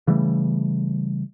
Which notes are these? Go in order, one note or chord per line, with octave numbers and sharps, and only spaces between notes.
C#3 E3 G3 A3